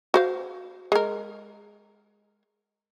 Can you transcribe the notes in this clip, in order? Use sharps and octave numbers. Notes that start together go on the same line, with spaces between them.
F#4 C5 F5
G#3 A#4